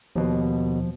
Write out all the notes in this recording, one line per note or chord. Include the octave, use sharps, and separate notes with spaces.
D#2 B2 F3